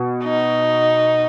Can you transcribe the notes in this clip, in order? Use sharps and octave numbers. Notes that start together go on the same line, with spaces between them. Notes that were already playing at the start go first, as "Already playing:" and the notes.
Already playing: B2
D#4